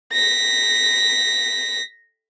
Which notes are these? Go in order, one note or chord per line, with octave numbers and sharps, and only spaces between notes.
A#6 B6